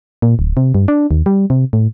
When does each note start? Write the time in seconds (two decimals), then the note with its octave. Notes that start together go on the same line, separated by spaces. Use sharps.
0.22 A#2
0.39 D1
0.57 C3
0.75 G2
0.88 D4
1.11 D#2
1.26 G3
1.50 C3
1.73 A2